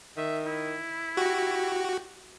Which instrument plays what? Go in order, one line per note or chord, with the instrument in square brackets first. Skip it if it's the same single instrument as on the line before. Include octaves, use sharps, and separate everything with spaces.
[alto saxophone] D#3 [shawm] E5
[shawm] E4
[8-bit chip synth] F#4 [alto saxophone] G4